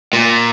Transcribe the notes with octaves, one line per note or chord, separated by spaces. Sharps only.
A#2